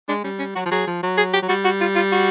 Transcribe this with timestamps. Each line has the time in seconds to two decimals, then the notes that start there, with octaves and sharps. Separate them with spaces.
0.09 G#3 D4
0.24 G3 C#4
0.39 C#4
0.56 F#3 F#4
0.65 F3
0.71 F#3 G#4
0.87 F3
1.03 F#3
1.18 G#4
1.33 G4
1.42 F#3
1.49 G3 F#4
1.64 F#4
1.81 F4
1.96 F4
2.12 F#4